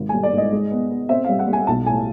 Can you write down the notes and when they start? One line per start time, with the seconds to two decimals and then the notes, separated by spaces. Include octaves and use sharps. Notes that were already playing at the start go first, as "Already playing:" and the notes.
Already playing: G#1
0.09 G3 G#5
0.23 D5
0.32 G#2
0.38 D#5
0.52 G#3
0.71 B3
0.90 B3
1.09 C4 E5
1.24 G3 F5
1.39 F#5
1.48 G3
1.53 G#5
1.67 B1 A5
1.87 A2 G#5